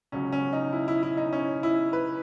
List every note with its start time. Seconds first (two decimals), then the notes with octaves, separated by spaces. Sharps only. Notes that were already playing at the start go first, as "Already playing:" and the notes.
0.12 C#2 C#3 F#3 C#4
0.32 C#4
0.53 D#4
0.73 E4
0.88 E4
1.03 E4
1.17 D#4
1.33 C#4
1.63 E4
1.93 B4